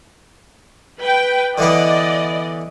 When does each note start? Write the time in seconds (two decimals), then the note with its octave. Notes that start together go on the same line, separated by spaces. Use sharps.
1.02 B4 G5
1.58 D3 E3 B3 D5 D#5